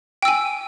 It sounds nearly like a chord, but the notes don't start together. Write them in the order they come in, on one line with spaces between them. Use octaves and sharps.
G5 E6 G#5